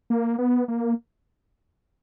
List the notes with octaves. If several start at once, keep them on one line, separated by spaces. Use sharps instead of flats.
A#3
B3
A#3